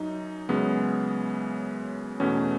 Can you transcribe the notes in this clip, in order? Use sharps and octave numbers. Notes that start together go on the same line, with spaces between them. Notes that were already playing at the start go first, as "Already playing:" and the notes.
Already playing: F#2 F#3 D#4
F#2 C#3 G#3 B3
E2 B2 A3 C#4